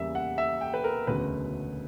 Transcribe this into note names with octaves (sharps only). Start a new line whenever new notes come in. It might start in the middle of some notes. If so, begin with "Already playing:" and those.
Already playing: E2 C#3 G3 A#3 E5
F#5
E5
G5
B4
A#4
E1 D2 C#3 F#3 B4